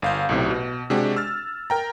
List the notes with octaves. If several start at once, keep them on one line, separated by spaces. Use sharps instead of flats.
G1 F5 G6
B1 A2 C3
B2
C3 G#3 D4 F#4 G4
E6 F6 A6
A#4 G5 A#5